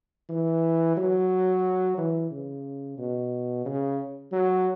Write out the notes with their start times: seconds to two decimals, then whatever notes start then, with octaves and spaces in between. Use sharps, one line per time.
0.29 E3
0.97 F#3
1.97 E3
2.31 C#3
2.98 B2
3.65 C#3
4.32 F#3